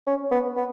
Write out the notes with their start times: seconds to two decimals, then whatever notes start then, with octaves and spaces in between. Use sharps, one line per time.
0.07 C#4
0.31 B3
0.56 B3